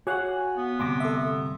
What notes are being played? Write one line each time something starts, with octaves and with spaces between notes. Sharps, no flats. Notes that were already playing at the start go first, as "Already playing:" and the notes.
F#4 C#5 F5 F#5 G#5
B3
D2 G2 C3 C6 D6 A#6
A4 E5